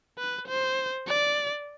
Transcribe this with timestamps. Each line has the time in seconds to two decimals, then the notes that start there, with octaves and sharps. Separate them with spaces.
0.18 B4
0.48 C5
1.08 D5